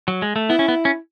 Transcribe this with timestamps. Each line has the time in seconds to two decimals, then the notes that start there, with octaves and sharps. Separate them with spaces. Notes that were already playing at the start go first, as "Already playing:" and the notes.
0.08 F#3
0.22 G#3
0.36 A3
0.50 B3 E4
0.59 C#4
0.68 B3
0.85 C#4